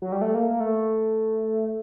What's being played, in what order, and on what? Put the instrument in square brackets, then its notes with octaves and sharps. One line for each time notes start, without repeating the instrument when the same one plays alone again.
[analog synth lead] F#3
G3
A3
A#3
A#3
A3